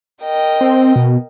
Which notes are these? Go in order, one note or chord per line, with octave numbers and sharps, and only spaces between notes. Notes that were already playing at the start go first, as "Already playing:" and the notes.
A#4 D#5 G5
C4
B2